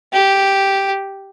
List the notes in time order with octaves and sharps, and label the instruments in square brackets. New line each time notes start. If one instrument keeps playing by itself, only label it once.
[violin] G4